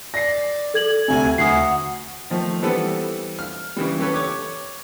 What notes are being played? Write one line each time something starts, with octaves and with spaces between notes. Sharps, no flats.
D5 A#6 C7
A4 G#6 F#7
D2 C3 G#5
D2 F#5 D#6 C7
D#3 F3 A3
E3 G3 B3 C4 A4 B4
F6
C#3 E3 G3
C#4 G4 A4 B4 C#5
C#5 D6